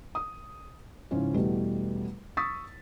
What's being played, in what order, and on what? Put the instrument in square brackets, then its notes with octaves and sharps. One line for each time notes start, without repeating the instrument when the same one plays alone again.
[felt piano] D#6
G#2 C#3 F3 C#4 E4 F4
E2 B2 G3 A3
C#6 D#6 E6 A6 B6